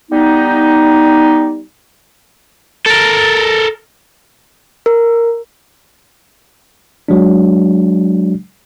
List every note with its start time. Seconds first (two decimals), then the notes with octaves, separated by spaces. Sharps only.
0.11 G3 B3 D#4
2.86 A4 A#4
4.86 A#4
7.08 F#3 G#3 D4